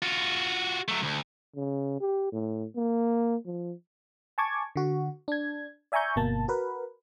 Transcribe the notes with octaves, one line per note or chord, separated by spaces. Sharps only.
F4 F#4
F#3 A3
D2
C#3
G4
A2
A#3
F3
G#5 A5 C#6 D6 G#6
D3 F#4
D4 G#6
D5 E5 G#5 A#5 C#6 G6
G1 B2 A#3 A5
F#4 A#4 B4